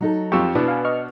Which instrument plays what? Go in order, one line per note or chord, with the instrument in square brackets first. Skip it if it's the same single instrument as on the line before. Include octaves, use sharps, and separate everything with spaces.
[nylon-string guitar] F#3 D#4 A4
[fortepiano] F2 F4 G4 [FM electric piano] C#6 E6
[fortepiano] B2 B3 D4 [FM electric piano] E4 [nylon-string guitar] B4
[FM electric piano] F5 G#5
D#5 C#6 F6